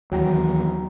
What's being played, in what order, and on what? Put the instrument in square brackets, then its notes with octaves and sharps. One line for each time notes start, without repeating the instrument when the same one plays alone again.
[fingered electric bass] D#2 E3 [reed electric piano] F#3 G5 A#5